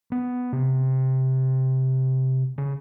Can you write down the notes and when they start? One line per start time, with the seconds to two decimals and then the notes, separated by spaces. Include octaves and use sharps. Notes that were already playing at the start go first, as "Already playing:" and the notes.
0.12 B3
0.53 C3
2.58 C#3